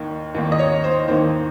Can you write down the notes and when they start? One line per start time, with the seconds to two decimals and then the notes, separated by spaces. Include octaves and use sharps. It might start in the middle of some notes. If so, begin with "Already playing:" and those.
Already playing: D#2 D#3 A#3
0.35 D#2 D#3 A#3
0.52 D#5
0.59 C#5
0.84 C5
1.08 D#2 D#3 A#3 C5